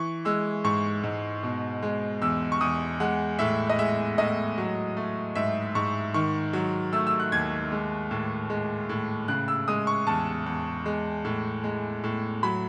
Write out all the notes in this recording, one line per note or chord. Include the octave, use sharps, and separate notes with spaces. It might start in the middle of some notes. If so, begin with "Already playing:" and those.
Already playing: E3 C#6
G#3 E6
G#2 C#6
G#2
B2
G#3
E2 E6
C#6
E2 D#6
G#3 F#5
A2 E5
D#5
G#3 E5
A2 D#5
F#3
A3
G#2 E5
G#2 C#6
D#3 C#6
F#3
A3 E6
E6
F#6
D#2 G#6
G#3
A2
G#3
A2
C#3 F#6
E6
G#3 D#6
C#6
E2 A5
E2
G#3
A2
G#3
A2
F#3 B5